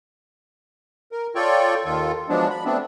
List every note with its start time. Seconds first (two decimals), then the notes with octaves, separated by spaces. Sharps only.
1.12 A#4
1.35 F4 A4 C#5 D5 G5 C#6
1.85 D#2 D#3 F4 A4
2.29 F3 F#3 G#3 B3 D4
2.50 B5
2.65 A3 B3 C4 D4